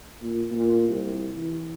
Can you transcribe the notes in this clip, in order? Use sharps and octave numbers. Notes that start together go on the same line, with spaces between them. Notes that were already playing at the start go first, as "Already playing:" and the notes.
A#2
A#2
C2
E3